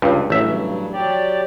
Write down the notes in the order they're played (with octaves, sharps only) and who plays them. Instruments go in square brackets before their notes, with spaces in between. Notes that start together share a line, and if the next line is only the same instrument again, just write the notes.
[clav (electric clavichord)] C#2 G2
[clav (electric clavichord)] A1 E5 [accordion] G2 C#3 F#3
[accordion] F#3 G4 D5